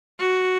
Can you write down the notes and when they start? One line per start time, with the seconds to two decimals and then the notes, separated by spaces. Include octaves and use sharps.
0.20 F#4